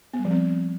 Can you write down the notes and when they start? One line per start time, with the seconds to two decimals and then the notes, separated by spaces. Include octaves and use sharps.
0.14 B3
0.19 G3
0.25 F3
0.30 C4